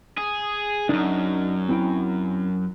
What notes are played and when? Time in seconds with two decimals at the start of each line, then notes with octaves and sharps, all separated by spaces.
0.18 G#4
0.89 C#2 F#2 D4 D#4
1.69 C4 E4 G5